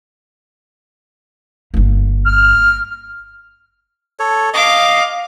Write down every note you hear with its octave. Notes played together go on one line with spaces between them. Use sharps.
G1 A#3
F6
A4 C#5
D#5 F5 D6